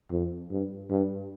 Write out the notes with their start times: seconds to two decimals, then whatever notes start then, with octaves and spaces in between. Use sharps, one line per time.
0.11 F2
0.50 G2
0.90 G2